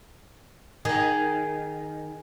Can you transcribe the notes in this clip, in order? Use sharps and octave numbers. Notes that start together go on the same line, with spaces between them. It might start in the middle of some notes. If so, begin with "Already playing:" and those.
D#3 G#4